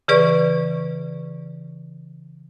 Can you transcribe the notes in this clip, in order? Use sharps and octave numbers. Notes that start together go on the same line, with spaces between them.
C#3 E3 G#4 B4 D5 C#6